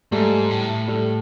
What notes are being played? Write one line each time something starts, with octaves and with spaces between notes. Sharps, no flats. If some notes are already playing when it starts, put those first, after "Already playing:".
G#2 G3 A3
A2
G3 A3